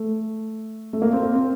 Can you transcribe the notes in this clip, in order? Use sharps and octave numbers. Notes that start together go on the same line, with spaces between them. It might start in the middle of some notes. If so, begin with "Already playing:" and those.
Already playing: A3
A3
A#3
C4
A#3
C4